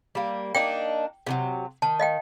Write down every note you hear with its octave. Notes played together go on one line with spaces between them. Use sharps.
G3 A#3
A#3 D4 D#4 G5
C3 E3 F#3
D#3 A5
D#5 F5 G5